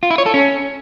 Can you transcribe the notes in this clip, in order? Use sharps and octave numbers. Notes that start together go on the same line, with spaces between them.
F4
E4
C#5
A4
C#4